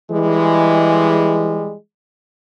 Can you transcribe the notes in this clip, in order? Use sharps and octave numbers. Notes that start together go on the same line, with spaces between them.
E3 G3 G#3